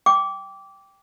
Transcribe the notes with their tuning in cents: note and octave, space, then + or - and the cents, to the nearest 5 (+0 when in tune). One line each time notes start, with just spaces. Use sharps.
G5 +0 D6 -15